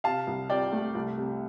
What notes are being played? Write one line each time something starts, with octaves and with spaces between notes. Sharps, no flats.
C3 F5 A5
C2
C3 D5 G5
A3
C2
C3